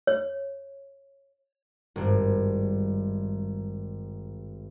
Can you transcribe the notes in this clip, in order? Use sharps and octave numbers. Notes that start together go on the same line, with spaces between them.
C#5
G#1 G2